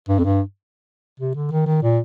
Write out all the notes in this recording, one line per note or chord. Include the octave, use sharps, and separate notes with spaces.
G2
F2
G2
C3
D3
D#3
D#3
A#2